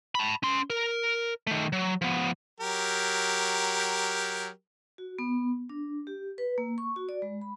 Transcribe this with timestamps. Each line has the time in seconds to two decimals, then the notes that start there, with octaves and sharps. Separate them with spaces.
0.15 A5 B5
0.43 C#4 C6
0.70 A#4
1.47 D#3 A3
1.73 F#3
2.02 F3 B3
2.60 F#3 G4 A#4
4.98 F#4
5.19 B3
5.69 D4
6.07 G4
6.38 B4
6.58 A#3
6.78 C#6
6.96 F#4
7.09 D5
7.22 G#3
7.41 B5